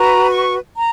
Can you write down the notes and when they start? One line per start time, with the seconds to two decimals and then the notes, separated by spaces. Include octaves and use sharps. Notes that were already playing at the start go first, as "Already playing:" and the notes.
Already playing: F#4 B4 A#5
0.30 C#6
0.77 A#5